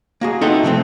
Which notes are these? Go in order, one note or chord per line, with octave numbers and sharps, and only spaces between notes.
A#3 F#4 G#4
B3 C4 D#4 E4 F#4 A4
C3 F3 A3 C4